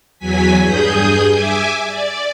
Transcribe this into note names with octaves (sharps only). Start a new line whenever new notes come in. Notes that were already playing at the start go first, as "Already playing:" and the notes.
E2 F#3 G#5 B6
G2 G#4 D#6 G6
E5 G#5 D6
D5